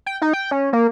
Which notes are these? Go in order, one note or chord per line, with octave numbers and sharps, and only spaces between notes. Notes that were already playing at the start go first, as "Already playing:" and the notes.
G5
D#4
G5
C#4
A#3